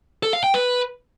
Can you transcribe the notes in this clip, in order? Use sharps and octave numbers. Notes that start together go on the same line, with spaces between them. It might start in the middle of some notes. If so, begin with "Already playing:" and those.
A4
F5
G5
B4